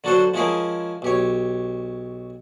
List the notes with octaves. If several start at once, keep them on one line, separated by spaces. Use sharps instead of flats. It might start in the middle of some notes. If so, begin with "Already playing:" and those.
D3 F#3 D4 F#4 A4 C5
F3 G#3 C#4 E4 G#4 A#4
B1 G4 C#5